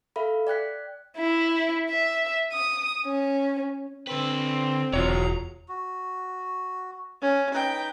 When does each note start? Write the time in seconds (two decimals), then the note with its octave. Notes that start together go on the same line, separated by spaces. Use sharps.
0.16 A4 E5 F5 B5
0.47 D5 G5 F#6 B6
1.18 E4
1.90 E5
2.53 D#6
3.05 C#4
4.07 D3 C4 B4
4.93 E1 F4 F#4 C#5 A#5
5.68 F#4
7.21 C#4
7.54 D#4 B4 G5 A#5